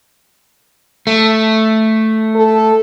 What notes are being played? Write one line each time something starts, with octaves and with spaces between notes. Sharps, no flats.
A3
A4